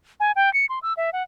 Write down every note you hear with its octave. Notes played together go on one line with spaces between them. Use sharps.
G#5
G5
C#7
C6
E6
E5
F#5